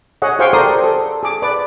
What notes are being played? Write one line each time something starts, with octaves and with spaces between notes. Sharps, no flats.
G#4 C#5 D#5 F#5
G4 G#4 C5 F5 G5 C#6
A4 A#4 C5 D5 C6 D#6
A4
G#4 D6
B4 D5 D6